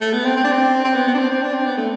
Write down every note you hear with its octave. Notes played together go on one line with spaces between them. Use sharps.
A3
B3
C4
C4
D4
C4
C4
B3
B3
D4
C4
C4
D4
C4
B3
A3